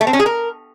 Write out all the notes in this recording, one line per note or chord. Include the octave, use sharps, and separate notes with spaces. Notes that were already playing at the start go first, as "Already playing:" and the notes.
A3
C4
C#4
G#4
A#4